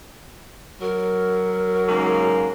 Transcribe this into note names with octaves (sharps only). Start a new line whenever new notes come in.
F#3 A#4
G#2 C#3 A#3